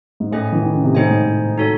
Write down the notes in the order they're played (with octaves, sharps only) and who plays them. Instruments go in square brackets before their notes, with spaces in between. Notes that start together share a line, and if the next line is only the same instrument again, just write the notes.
[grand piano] G#2
[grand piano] A2 [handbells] A3 C#4 G#4 D#5 G#5
[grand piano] E3
D#3
C#3
C3
[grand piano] A2 [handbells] D#4 G#4 C5 D#5 G#5
[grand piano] G#2
A2
[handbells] D#4 F#4 A4 C#5